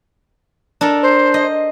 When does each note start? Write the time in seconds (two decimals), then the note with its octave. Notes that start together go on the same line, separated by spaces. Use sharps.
0.81 D4 A4 A#4
1.02 C5
1.34 D#5